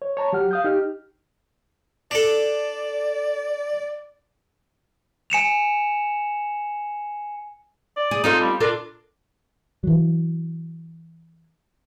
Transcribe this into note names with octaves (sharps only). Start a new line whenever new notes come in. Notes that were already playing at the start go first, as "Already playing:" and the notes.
C#5
C#5 A5 A#5
F#3 G4 F#5 F6
F5 D#6 G6
D#4 G4 F6
D4 A4 D5
G#5 C#7 E7 F7
D5
G#4
C4 D#4 F4 A4
G3
D4 F4 A4 A#4
E3 F#3